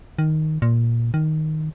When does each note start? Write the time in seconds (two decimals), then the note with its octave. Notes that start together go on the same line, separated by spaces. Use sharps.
0.19 D#3
0.62 A#2
1.14 D#3